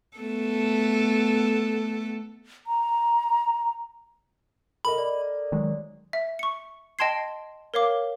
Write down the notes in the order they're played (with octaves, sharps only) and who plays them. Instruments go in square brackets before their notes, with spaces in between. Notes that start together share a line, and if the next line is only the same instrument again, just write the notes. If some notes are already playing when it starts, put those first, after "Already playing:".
[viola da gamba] A3 B3 A4
[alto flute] A#5
[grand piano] A4 A#4 D#5 [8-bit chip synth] B5
[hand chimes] D5
[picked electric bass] D#3 F#3 G#3
[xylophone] E5
C#6 C#7
D#5 G5 A5 C6 G#6 C7
A#4 C#5 F5 D6